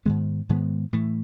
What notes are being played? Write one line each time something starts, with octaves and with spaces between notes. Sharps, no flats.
G#2 D#3 G#3 B3
G#2 D#3 G#3 B3
A2 E3 A3